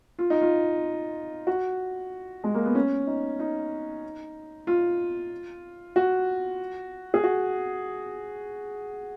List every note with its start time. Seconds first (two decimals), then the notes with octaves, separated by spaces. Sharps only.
0.19 F4
0.30 D#4
0.41 F4
1.47 F#4
2.44 G#3
2.55 A#3
2.65 B3
2.75 C#4
3.07 D#4
3.39 D#4
4.67 F4
5.96 F#4
7.14 G#4
7.23 F#4